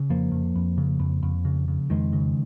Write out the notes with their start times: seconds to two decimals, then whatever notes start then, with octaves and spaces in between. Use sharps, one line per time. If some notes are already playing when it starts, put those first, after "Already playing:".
Already playing: C#3
0.10 F2 F3 A#3
0.32 F2
0.56 F2
0.78 C#3
1.00 F2
1.23 F2
1.45 C#3
1.68 C#3
1.90 F2 D#3 G#3
2.13 C#3